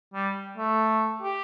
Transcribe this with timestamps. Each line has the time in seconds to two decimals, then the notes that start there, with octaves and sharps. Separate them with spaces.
0.14 G3
0.57 A3
1.22 G4